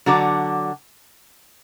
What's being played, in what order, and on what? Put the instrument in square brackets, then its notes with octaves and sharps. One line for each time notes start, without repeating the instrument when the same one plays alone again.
[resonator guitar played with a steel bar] D3 F#3 D4 F#4 D5